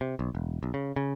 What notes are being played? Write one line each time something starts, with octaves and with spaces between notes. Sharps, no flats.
C3
B1
E1
B1
C#3
C#3